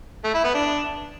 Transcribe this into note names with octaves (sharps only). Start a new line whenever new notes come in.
A3
E4
B3
D4